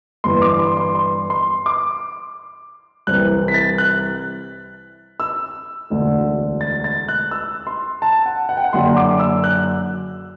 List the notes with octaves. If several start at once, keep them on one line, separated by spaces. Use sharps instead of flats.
G1 G2 E3 C6
D6
C6
C6
C6
C6
D6
C2 C3 E3 F#6
B6
A6
F#6
E6
E1 D2 D3
A6
A6
F#6
E6
C6
A5
F#5
F#5
G5
F#5
F#1 F#2 D3 C6
D6
E6
F#6